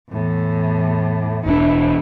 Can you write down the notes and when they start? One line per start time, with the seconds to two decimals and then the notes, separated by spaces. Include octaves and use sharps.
0.10 E2 A2
1.46 E1 E2 D4 E4